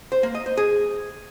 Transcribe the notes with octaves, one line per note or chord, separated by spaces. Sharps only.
C5
A#3
D#5
C5
G#4